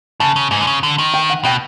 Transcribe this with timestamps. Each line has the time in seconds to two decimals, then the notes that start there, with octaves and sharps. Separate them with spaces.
0.20 C#3 A5
0.36 C#3
0.51 G#2 G#5
0.61 D3
0.67 C#3
0.83 D3
0.99 D#3
1.14 G5
1.30 F#5
1.44 B2 G5